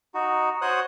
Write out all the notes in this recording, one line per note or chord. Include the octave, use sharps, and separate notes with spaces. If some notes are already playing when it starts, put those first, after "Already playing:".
D#4 F#4
F#4 C5 C#5 D#6 F#6